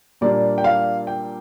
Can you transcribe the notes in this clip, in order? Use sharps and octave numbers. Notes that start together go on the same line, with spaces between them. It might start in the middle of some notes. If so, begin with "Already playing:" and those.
A#2 G3 A#3 D4 D5
G5
F5
G5